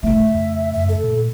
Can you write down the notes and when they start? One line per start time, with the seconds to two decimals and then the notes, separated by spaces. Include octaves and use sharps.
0.03 C#3 A3 E5
0.35 F2
0.74 F#2 E5
0.89 A4
1.04 A#2